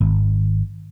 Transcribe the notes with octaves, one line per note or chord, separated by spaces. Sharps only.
G#1